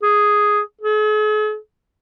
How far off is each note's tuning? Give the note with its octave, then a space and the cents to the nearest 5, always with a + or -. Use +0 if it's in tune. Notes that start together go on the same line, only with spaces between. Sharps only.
G#4 +0
G#4 +45